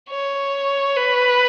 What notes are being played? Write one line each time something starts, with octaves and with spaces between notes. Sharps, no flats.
C#5
B4